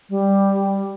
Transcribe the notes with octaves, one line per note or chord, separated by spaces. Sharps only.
G3